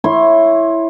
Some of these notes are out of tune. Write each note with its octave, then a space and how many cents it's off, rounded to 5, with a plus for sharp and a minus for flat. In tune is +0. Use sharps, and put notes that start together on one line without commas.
E4 +0 C#5 +0 C6 +20